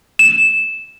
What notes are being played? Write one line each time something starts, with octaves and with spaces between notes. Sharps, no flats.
E7